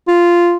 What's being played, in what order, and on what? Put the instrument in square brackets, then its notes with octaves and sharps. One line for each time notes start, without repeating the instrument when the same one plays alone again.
[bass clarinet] F4